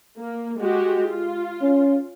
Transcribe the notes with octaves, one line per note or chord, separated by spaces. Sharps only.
A#3
G#3 F#4 G4
F4
C#4